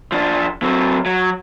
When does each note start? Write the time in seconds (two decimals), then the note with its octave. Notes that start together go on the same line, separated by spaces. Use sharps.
0.12 F3 D4
0.63 F#3 C4
1.06 F#3